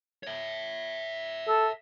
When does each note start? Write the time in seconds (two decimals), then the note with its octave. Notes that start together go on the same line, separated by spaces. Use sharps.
0.23 C#5 E5
1.48 A4